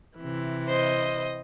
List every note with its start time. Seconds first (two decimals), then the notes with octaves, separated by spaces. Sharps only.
0.18 C3 E3
0.69 C5 D#5